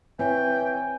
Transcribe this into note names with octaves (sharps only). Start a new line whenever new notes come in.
E3 C4 C#5 G5 G#5